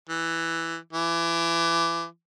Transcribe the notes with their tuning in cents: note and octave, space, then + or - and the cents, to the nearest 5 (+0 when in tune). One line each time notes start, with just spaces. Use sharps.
E3 +5
E3 +30